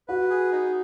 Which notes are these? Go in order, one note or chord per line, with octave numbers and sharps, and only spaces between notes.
F#4 B4
G#4
D#4